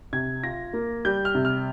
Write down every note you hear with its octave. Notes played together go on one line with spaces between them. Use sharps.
C3 G#6
F4 A#6
A#3
G3 G6
F6
C3
F6